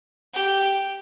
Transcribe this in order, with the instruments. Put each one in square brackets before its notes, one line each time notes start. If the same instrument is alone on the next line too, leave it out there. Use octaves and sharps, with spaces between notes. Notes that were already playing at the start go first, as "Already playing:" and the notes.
[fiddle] G4